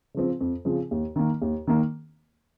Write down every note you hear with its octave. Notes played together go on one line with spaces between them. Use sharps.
C#3 F3 C4
F2
C#3 F3 C4
D#2
D#3 A#3
D#2
D#3 A#3